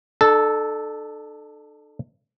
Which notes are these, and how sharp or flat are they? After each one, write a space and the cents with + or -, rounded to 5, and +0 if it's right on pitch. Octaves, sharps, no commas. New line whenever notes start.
D4 +40 A4 -10